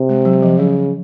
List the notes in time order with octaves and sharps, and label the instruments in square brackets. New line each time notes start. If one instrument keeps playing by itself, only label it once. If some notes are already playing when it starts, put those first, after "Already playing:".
Already playing: [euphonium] C3
[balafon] G#3
F#3
F3
[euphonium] C#3 [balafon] F#3